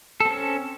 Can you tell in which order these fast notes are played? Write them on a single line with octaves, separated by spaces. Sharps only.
A4 C4 C#4